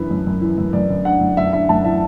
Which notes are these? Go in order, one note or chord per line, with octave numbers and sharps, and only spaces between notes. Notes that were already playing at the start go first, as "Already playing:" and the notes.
Already playing: F#2 E3 D4 B4
F#2
F#2
E3
F#2
F#2 D5
F#2
D4 F#5
F#2
F#2 E5
D4 E5
F#2 A5
E3 E5